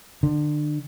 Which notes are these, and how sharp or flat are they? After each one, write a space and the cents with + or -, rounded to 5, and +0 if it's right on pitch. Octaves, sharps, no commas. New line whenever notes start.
D3 +30